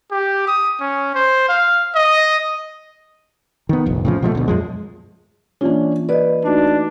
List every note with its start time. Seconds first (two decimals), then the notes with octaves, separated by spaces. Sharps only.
0.11 G4
0.48 D#6
0.81 C#4
1.15 C5
1.49 F5
1.95 D#5
3.69 D#3 B3
3.86 F1 A#1
4.05 A2 C#3 F3
4.22 B2 F3 G3 A3
4.35 D2 B2
4.48 F#2 F3 G#3
5.61 E3 A#3 C#4 D4 F4
6.09 B4 D5 D#5
6.45 A3 D4 D#4 F#4